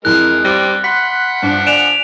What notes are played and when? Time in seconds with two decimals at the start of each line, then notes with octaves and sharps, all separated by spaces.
0.05 F2 E3 G#3 A#4 F#6
0.45 G3 C4 D6 A#6
0.84 F#5 B5 C6 B6
1.43 G2 F3 D4
1.66 D5 G#5 F#6 D7 E7 F7